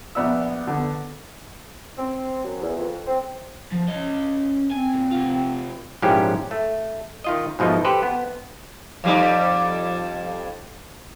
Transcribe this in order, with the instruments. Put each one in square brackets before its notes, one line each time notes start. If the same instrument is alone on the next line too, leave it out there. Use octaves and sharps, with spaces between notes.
[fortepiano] A#1 B3 D5 E5 E6
D3 B3
[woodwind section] C4
F#2
E2
F2
C4
[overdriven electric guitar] F3
C#4 D#5
[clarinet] C4 [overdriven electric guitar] G#5
[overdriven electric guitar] A#2
C3 F4
[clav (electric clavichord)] A#1 G#2 F3 C#4 E4 G4
A3
D#3 F4 D#5
G#2 B2 F3 A3 D#4
G4 A4 B4 C5
B3
[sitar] F2 G3 D#4